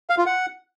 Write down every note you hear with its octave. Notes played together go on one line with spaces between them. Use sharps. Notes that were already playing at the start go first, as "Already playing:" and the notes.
F5
F4
F#5